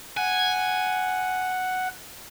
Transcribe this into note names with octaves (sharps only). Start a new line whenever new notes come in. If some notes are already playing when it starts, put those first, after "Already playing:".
F#5 G#5